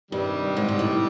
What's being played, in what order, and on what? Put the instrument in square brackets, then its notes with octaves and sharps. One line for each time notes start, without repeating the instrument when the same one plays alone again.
[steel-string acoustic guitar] G2 [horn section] C3 D#3 G3
[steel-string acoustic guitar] G#2
G#2
A2